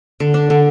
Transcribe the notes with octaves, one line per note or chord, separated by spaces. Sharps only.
D3
D4
D3